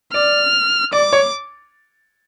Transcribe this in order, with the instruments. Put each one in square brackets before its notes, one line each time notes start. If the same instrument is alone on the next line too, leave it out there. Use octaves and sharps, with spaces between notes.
[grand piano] D5 [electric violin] F6
[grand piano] D5 [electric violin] D6
[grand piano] C#5